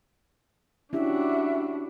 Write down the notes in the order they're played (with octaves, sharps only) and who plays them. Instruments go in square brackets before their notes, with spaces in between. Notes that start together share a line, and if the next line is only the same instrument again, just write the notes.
[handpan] C#4 E4 G4 [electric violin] D4 F#4 [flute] E5